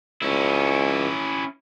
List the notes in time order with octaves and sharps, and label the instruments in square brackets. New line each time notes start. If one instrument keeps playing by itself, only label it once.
[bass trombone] C#2 [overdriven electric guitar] C#4 E4